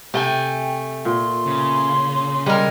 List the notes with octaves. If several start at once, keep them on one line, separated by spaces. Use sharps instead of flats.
C3 A3 G5 G#5
A#2 C6
C#3
G3 G#3 A#4